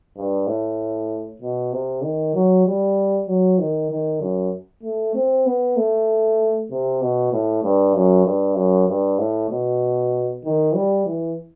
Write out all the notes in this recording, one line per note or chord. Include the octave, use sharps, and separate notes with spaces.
G2
A2
B2
C3
D#3
F#3
G3
F#3
D#3
D#3
F#2
A3
C4
B3
A3
C3
B2
A2
G2
F#2
G2
F#2
G2
A2
B2
D#3
G3
E3